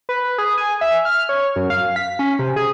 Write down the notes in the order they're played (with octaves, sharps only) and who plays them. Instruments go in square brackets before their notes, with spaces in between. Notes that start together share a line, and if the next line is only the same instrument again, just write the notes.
[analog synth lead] B4
G#4
G#5
E5
F6
C#5
F#2
F5
B6
C#4
C3
G#4